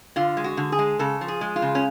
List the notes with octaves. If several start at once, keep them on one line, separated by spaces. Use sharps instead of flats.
D3 F4
G#3
F#4
D3
G#4
G#3
C#3 A4
F3
G#4
G#3
F4
C#3
C#4